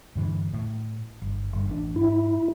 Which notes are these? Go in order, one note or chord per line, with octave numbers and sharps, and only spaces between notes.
G2 D3 E3
A2
G1
G1 G2
A1 D4
G#2 E4